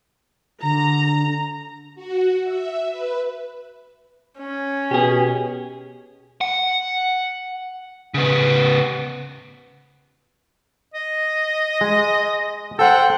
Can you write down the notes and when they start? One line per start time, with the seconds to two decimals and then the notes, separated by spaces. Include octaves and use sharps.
0.62 D3 A#5
1.95 F#4
2.44 E5
2.91 B4
4.39 C#4
4.91 B2 G4 G#4
6.41 F#5
8.14 C#3 B3
10.94 D#5
11.81 G#3
12.79 A4 C5 F#5 G5